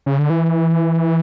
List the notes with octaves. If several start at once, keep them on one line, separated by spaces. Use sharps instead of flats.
C#3
D3
E3